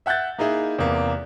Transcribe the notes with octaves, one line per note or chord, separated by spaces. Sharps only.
E5 F#5 F#6 G6 A6
A#3 D#4 E4 G#4
E2 C3 A#3